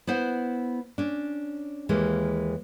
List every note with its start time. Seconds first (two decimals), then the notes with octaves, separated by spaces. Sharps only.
0.07 B3 E4 C5 F#5
0.98 C#4 D4
1.89 D#2 E3 G#3 A#3